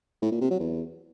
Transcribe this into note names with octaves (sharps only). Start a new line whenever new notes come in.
A2
A#2
C3
F#3
E2